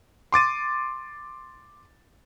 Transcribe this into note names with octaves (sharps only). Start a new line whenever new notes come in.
C6 D6 A6 D#7